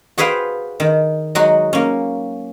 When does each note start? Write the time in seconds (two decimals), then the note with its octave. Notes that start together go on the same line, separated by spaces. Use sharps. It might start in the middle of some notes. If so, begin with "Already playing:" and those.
0.18 F#4 G#4 B4 C5 F5 G5
0.80 D#3
1.35 F#3 G#3 D#4 F#4
1.73 A#3 C#4